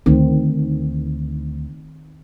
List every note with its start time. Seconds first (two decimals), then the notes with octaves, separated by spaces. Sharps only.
0.06 D2 D#3 C4